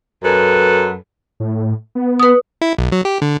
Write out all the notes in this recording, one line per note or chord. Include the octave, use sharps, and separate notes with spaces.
F#2 A4 B4
A2
B3
B4 D#6
E4
B1
F#3
G4
D3